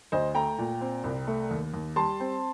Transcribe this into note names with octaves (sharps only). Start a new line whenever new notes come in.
D2 C5 D#5
A3 G5 A#5
A#2
C4
C2
A3
D#2
D#2
G3 A5 C6
C4